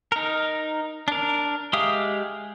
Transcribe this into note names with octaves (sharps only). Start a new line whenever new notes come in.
D#4 A#4
D4 A#4
G#3 G4 E5 F5 D#6